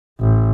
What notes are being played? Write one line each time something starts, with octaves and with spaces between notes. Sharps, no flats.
A1